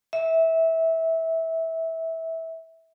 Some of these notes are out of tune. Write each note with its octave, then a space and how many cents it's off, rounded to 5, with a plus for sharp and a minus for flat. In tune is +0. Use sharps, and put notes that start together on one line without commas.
E5 -20